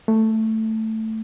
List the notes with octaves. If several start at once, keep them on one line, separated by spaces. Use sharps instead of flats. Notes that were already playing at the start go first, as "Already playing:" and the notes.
A3